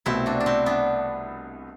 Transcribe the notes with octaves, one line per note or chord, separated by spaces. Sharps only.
C2 B2 A3 C4 E4
D4 F#4
D4
C4 E4
B3 D4